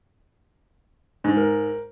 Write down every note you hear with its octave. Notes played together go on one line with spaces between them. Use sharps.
G#2
A#4